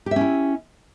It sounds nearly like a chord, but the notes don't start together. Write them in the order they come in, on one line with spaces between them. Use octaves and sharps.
G4 E5 C#4 E4